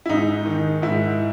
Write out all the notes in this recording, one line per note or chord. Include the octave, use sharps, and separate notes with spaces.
E4
G#2 D#4
D#3
G#2 E4